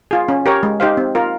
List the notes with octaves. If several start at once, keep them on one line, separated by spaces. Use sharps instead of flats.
F4 G#4
C#4
G4 A#4 C#5
G#3
D#4 G4 C5 F5
C4
F4 A#4